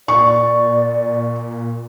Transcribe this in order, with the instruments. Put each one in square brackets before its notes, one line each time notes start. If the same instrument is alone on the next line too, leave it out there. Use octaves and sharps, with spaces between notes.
[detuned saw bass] A#2 [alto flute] D5 [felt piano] C#6